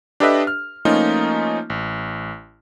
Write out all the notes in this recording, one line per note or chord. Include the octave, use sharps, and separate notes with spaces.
D4 G4 A4 B4 D#5 E5
F6
F3 A3 A#3 C#4 D#4 F4
A1